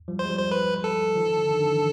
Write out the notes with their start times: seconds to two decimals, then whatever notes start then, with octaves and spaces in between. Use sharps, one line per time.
0.08 F3 G3
0.19 C5
0.25 G#3
0.29 F3 G3
0.39 C5
0.52 B4
0.84 A4
1.15 D#3 F3
1.37 D3
1.51 D#3
1.59 D3
1.72 E3